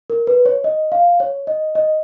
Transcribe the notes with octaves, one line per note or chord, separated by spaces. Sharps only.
A#4
B4
C#5
D#5
F5
C#5
D#5
D#5